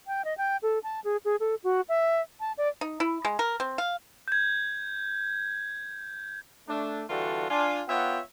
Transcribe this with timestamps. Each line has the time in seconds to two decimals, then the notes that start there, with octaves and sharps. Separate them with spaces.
0.07 G5
0.25 D#5
0.38 G5
0.63 A4
0.83 A5
1.04 G#4
1.25 G#4
1.40 A4
1.64 F#4
1.89 E5
2.40 A5
2.58 D5
2.81 D#4
3.00 E4
3.25 G#3
3.39 A#4
3.60 C4
3.78 F5
4.28 G6 G#6
6.67 A3 D4
7.09 D3 E3 G3 F4 F#4 A4
7.50 D4 F4 G#5
7.88 B3 F4 C#5 E5 F#5 G5